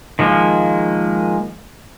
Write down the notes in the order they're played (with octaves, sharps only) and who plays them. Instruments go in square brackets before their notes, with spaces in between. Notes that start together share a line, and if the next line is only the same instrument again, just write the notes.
[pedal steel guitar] D#3 F3 G#3 A#3